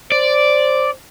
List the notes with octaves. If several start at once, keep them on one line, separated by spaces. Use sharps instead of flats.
C5 D5